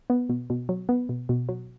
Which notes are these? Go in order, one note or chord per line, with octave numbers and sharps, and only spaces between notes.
B3
B2
B2
F#3
B3
B2
B2
F#3